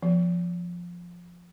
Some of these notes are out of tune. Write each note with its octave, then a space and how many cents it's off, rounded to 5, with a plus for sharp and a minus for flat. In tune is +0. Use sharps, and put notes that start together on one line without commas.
F3 +0 B3 -15